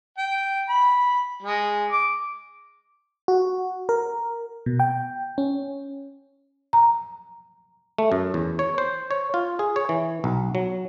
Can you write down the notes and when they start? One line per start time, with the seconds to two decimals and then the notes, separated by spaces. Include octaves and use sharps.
0.18 G5
0.69 B5
1.42 G#3
1.91 D6
3.28 F#4
3.89 A#4
4.66 B2
4.80 G5
5.38 C#4
6.73 A#5
7.98 A3
8.12 F#2
8.34 E2
8.59 C#5
8.78 C5
9.11 C#5
9.34 F4
9.59 G#4
9.76 C#5
9.89 E3
10.24 B1
10.55 F#3